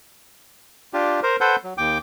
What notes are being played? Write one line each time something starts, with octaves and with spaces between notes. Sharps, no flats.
D4 F4 G4
A#4 C5
A4 B4 C5 F#5 G6
F#3
D#2 G5 D6